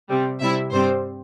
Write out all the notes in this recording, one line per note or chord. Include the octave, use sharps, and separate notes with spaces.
C3 G3 C4
C3 G3 E4 E5
G2 G3 C4 C5